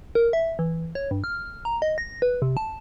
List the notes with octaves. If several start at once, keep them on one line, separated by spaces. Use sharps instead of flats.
A#4
E5
E3
C#5
G2
F6
A#5
D#5
A#6
B4
C3
A5